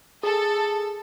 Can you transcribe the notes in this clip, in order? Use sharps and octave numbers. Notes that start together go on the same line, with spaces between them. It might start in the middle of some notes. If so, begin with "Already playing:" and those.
G#4 A4